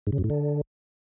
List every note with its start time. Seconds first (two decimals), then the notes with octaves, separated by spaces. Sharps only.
0.07 G#2
0.12 C#3
0.18 F#2
0.24 A2
0.30 D3